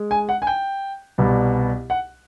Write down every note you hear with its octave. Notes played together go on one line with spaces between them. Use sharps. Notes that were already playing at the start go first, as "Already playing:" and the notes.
Already playing: G#3
G#5
F#5
G#5
G5
C2 B2 G3
F#5